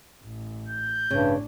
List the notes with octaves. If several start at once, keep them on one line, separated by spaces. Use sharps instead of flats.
A1
G6
A1 G2 C#3 D4